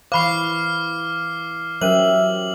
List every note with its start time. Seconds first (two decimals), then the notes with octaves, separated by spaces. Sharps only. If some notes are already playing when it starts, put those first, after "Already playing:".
0.12 E3 C5 F5 B5 C#6 D6 F6 C7
1.82 F#3 C#4 G4 A#4 C5 E5 F#7